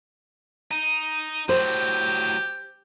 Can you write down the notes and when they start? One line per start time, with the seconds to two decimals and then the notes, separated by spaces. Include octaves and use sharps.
0.71 D#4
1.49 A2 F#3 G4 C5